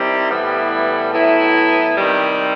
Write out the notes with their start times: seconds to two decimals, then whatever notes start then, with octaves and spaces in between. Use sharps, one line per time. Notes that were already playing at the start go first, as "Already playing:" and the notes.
Already playing: C3 D#3 G3 C4 E4
0.30 A2 E3 G3 B3 E4
1.13 A2 F#3 B3 E4
1.97 C3 D#3 G3